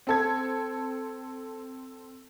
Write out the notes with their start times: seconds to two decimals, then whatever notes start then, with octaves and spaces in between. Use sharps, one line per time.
0.07 C4 A4 G#6